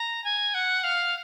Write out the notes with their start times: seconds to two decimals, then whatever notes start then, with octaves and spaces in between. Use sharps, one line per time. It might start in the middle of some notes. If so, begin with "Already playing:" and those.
Already playing: A#5
0.24 G#5
0.54 F#5
0.84 F5